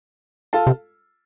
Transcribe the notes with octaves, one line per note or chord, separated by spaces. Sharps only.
F4 A4
C3